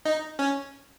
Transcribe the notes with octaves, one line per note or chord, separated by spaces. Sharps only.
D#4
C#4